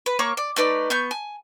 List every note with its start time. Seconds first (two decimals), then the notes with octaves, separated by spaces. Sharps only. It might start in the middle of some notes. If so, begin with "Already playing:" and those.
0.06 B4
0.19 A#3 C#5 C#6 D6
0.37 D5
0.56 A3 D#4 B4 D5
0.90 B3 C#6 G6
1.11 G#5